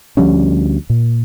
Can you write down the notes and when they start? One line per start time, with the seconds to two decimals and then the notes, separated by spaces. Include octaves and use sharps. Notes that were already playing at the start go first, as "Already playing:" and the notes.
0.17 D2 F3 G3 C#4
0.90 A#2